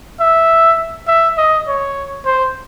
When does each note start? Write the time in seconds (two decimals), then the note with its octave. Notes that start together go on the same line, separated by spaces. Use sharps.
0.20 E5
1.08 E5
1.37 D#5
1.68 C#5
2.25 C5